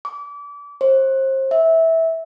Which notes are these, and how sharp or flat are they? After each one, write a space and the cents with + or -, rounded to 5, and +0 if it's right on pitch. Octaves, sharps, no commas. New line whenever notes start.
D6 -30
C5 +30
E5 -15